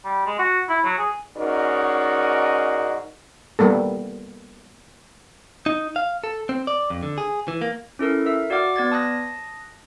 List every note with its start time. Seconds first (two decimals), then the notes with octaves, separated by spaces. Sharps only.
0.05 G3
0.26 G#3
0.39 F#4
0.69 E4
0.85 F#3
0.98 G#4
1.37 G#2 C#4 D#4 F#4 A#4 D5
3.59 G3 A#3 B3 A4
5.66 D#4
5.96 F5
6.24 A4
6.49 C4
6.67 D5
6.90 F2
7.03 D3
7.18 G#4
7.48 E3
7.61 A#3
7.99 C#4 E4 A4 A#4
8.26 A#4 E5 E6
8.50 F#4 D5 F5 F#5 D6 F6
8.76 B3 D5 G#6 A6
8.92 A5 D#6 F#6 A#6